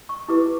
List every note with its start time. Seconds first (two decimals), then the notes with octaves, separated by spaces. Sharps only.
0.09 C#6
0.28 E4 G4 B4 D6